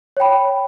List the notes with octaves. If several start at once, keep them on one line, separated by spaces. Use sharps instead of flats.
C#5 G5 B5